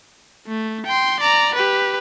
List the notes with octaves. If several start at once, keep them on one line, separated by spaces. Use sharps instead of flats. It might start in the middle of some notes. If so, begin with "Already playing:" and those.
A3
G5 C6
D5 A#5
G4 B4